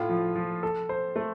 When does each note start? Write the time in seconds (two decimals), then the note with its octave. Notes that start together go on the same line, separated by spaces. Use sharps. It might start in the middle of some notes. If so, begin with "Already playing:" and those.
Already playing: A2 F4
0.09 F3
0.36 F3
0.63 A4
0.89 C5
1.16 A3